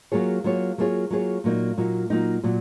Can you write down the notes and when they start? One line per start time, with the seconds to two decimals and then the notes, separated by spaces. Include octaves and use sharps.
0.12 F#3 A#3 F4 G#4 C#5
0.44 F#3 A#3 F4 G#4 C#5
0.78 F#3 A#3 F4 G#4 C#5
1.10 F#3 A#3 F4 G#4 C#5
1.44 A#2 F#3 A#3 D#4
1.77 A#2 F#3 A#3 D#4
2.10 A#2 F#3 A#3 D#4
2.43 A#2 F#3